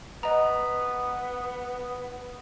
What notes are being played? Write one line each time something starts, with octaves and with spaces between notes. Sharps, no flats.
B3 D#5 A#5